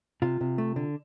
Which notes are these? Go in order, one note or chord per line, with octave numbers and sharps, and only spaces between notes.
C3 F4
C3
A3
D3